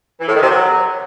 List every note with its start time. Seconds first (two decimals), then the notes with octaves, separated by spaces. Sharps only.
0.20 E3
0.28 A2
0.35 D#3
0.42 C3
0.49 F#3